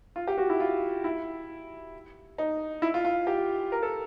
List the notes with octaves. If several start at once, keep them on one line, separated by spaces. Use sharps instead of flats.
F4
G4
F#4
E4
F4
E4
D#4
E4
F4
F4
G4
A#4
A4